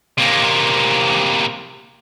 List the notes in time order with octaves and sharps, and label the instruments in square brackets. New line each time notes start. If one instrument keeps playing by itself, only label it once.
[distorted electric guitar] C3 A#3